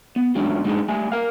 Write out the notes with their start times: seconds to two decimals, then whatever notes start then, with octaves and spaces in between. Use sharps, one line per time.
0.16 B3
0.35 E2 G#2 F#3 A3 C#4 D4
0.64 G3 G#3 C4 D4 D#4 G#4
0.88 G3 A3 G#5
1.12 A#4 F5